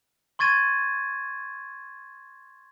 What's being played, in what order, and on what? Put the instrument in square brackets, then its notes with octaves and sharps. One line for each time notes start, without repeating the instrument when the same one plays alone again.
[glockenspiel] C6 C#6 G#6 A6 D#7